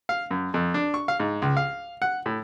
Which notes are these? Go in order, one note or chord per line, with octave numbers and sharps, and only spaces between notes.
F5
F#2
F2
D4
C#6
F5
G#2
C#2
F5
F#5
A2